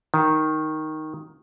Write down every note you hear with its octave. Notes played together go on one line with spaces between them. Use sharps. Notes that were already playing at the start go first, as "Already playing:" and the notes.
D#3